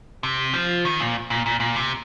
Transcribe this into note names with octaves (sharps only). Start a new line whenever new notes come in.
C3
F3
D#3
A#2
A#2
A#2
A#2
C3